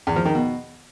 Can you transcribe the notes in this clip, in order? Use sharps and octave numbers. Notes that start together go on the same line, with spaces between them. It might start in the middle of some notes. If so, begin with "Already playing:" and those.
E2
F3
D#3
B2